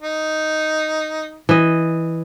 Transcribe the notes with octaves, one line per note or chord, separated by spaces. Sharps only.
D#4
E3 D#5